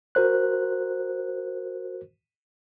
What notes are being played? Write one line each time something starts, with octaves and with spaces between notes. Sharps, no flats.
F#4 A#4 C5 F#6